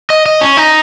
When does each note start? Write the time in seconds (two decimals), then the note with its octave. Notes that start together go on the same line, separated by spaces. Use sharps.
0.10 D#5
0.26 D#5
0.41 C#4
0.57 D#4